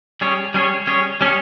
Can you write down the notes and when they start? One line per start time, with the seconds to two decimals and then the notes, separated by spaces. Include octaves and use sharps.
0.21 G3 C#4 G#4 C#5
0.54 G3 C#4 G#4 C#5
0.87 G3 C#4 G#4 C#5
1.21 G3 C#4 G#4 C#5